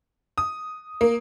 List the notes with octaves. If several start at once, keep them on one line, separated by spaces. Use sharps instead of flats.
D#6
A#3